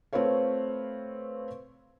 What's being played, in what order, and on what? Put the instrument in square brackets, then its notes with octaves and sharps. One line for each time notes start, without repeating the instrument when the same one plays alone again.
[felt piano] A3 C4 F4 B4 C#5 F5